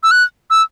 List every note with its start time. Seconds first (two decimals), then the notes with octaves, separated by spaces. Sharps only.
0.03 E6
0.11 F#6
0.50 E6